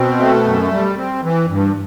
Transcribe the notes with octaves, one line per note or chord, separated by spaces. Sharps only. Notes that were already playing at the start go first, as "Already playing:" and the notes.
Already playing: B2 C4
A3
F#2
G3
C4
E3
G2